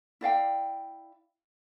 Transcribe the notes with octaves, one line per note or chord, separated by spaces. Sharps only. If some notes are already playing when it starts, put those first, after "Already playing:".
E4 D5 F5 G5